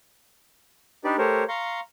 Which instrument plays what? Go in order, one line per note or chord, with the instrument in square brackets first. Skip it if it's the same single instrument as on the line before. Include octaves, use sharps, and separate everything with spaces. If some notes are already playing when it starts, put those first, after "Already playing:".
[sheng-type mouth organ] D4 D#4 G4 B4 D5
A3 G4 A#4 C5 C#5
F5 A#5 C6 C#6